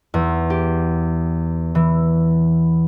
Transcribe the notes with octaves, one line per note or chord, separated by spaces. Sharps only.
E2
G4
E3